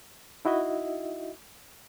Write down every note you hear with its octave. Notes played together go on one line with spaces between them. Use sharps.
D#4 E4 F#4 D#5 E5